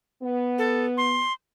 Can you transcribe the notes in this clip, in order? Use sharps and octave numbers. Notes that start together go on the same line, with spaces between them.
B3
A4
C6